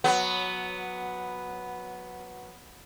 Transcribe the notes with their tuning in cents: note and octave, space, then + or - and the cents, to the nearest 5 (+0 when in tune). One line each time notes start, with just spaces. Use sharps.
F#3 -10 B3 +0